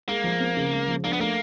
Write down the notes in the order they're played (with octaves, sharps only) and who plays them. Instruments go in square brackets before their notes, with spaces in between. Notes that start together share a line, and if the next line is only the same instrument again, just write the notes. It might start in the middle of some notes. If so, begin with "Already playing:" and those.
[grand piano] G#3 [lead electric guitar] A#3
[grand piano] F3
C4
C#3
G#3
F3
[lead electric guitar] A#3 [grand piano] D4
[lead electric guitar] B3
[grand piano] A3 [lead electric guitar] A#3